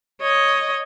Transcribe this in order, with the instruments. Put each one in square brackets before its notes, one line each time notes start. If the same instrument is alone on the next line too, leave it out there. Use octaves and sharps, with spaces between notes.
[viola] C#5 D#5